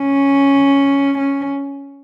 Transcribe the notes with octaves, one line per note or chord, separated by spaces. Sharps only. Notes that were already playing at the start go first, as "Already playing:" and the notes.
Already playing: C#4
C#4